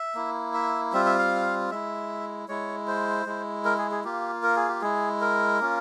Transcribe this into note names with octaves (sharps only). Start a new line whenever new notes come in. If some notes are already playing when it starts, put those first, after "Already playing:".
Already playing: E5
A#3 E4
E5
G3 C4 F4 E5
E5
F5
G#3 E4 E5
G#3 E4 C#5
C5
G#3 E4
A#4
G#4
G#4
A#3 F4 G4
A#4
G#4
G4
G#3 E4 G#4
A#4
A#3 C#4 F4